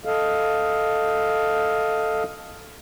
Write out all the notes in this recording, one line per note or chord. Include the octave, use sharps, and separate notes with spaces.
A4 D#5 F5